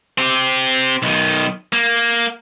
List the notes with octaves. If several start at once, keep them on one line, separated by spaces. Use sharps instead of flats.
C4 G4
B1 D#3
A#3